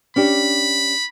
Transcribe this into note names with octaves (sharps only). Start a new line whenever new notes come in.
C#4 D4 G4 B5